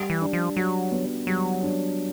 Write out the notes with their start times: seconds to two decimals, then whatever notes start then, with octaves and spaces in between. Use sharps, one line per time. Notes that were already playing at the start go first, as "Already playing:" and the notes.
Already playing: G3
0.10 E3
0.22 D4
0.33 F3
0.56 F#3 F#4
0.92 B3
1.27 F#3 G3
1.63 D4